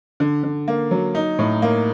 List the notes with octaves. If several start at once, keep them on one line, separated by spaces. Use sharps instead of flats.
D3
D3
A#3
F#3
D#4
A2
A#3